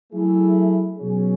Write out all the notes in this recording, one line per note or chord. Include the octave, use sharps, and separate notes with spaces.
F#3 A3 E4 G#4
B2 F#3 C#4 G#4